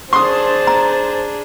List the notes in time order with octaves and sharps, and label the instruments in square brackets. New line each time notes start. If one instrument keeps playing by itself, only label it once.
[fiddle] D4 G#4 [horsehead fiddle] C5 A5 [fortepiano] C6 D#6
[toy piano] A#5